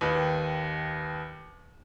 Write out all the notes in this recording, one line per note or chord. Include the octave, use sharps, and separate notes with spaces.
D#2 D#3 B4